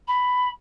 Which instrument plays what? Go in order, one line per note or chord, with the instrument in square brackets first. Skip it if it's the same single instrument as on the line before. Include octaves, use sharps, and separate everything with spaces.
[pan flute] B5